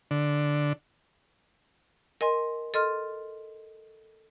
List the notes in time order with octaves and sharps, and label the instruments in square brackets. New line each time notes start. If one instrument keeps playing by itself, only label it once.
[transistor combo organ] D3
[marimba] A#4 D#5 G#5 C6
A4 D#5 C6 F6